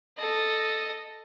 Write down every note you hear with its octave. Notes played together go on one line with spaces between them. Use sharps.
A4 D#5